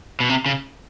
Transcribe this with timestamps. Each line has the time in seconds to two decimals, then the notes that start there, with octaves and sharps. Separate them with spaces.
0.20 B2
0.29 C3
0.46 C#3